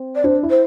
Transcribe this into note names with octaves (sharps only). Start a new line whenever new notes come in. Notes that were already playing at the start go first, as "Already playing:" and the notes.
Already playing: C4
D5
D4 C5
E4
C5